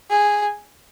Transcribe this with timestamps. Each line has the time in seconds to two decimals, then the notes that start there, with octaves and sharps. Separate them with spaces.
0.10 G#4